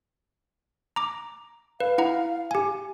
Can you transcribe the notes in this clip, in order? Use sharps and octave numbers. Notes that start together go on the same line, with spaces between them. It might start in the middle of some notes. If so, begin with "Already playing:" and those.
A#5 D6
B4 F5
E4 F#5 A#5
G4 G#5